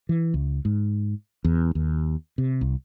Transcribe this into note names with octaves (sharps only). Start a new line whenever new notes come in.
E3
C#2
G#2
E2
D#2
C3
C2